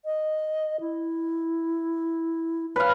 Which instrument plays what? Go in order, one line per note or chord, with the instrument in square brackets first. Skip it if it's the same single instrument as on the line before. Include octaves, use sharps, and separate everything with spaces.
[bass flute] D#5
E4
[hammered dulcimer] B4 F5 [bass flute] C#5